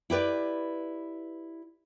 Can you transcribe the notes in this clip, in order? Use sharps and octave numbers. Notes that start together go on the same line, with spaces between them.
E4 G4 B4 D5